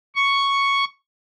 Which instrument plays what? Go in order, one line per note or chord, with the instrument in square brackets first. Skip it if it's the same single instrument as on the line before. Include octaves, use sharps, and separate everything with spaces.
[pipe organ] C#6